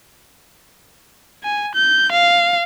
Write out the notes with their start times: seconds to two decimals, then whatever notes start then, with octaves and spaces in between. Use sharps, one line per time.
1.43 G#5
1.75 G6
2.11 F5